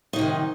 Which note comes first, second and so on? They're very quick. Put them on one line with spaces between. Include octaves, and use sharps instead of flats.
D#4 F#3 C3 D#3